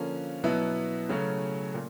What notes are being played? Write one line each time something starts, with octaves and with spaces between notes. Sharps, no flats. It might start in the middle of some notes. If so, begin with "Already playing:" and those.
Already playing: D3 F3 A#3 C#4
B2 F#3 B3 E4
C#3 F#3 A3 C#4
A#2